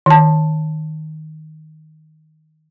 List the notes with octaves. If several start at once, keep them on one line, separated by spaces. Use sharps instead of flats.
D#3 A5